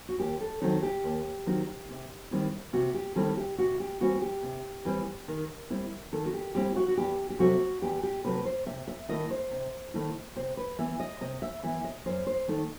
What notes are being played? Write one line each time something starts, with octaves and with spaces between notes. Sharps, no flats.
F#4
D#2 G4
A4
D#3 F#3 C4 D#4 A4
G4
D#2
D#3 F#3 C4 D#4
C3
D#3 G3 C4 E4
C3 F#4
G4
D#3 G3 C4 E4 A4
G4
C3 F#4
G4
E3 G3 C4 F#4
G4
C3
E3 G3 C4
D#3
G3 C4 E4
D#3 A4
F#4
G4
G3 C4 E4 G4
F#4
F#4
E2 G4
G4
C3 F#3 A3 C4 F#4
E2 G4
G4
C3 F#3 A3 C4 B4
B4
C5
C3 E5
E5
D#3 A3 E4 D#5
C5
C3
D#3 A3 E4
C3 C5
B4
E3 B3 E5
D#5
C3 D#5
E5
E3 B3 E5
D#5
F#2 C5
C5
D#3 A3 D#4